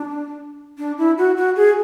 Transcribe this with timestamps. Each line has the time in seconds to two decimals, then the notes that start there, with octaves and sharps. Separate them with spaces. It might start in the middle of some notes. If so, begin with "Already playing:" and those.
Already playing: D4
0.79 D4
0.98 E4
1.18 F#4
1.37 F#4
1.56 G#4